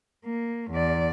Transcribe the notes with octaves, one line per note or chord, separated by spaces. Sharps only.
A#3
E2 D5